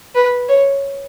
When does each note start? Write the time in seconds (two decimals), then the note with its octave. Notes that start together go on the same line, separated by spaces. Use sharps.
0.15 B4
0.48 C#5